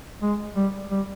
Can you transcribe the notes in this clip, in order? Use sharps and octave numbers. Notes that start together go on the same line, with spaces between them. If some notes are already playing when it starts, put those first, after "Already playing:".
G#3
G3
G3